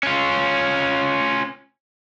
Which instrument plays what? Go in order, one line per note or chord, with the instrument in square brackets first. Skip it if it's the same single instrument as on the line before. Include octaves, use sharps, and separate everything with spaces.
[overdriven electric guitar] C#4 F4